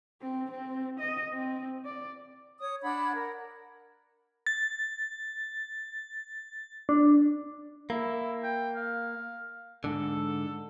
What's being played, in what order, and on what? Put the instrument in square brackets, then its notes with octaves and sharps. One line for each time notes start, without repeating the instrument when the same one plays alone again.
[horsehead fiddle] C4
C4
D#5
C4
D5
[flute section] C#5 D#6
D4 F#5 B5 G#6
A#4
[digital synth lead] A6
D4
[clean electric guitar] A#3 [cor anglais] E4
[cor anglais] G5
F5
[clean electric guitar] G#2 D3 [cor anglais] A4